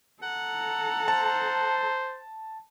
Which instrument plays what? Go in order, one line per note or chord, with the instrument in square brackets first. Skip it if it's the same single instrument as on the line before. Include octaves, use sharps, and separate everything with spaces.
[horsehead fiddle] A4 A#5 [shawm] F#5
[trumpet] C5 [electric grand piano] A5